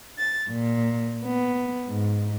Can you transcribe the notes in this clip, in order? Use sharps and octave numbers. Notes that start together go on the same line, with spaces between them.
A6
A#2
B3
G#2